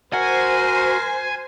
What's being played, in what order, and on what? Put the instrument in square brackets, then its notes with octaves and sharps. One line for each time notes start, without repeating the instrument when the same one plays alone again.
[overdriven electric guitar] F#4 [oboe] A#4 [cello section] C5 [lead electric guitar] G#5